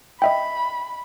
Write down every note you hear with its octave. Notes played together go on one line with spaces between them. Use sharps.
D#5 E5 G5 B5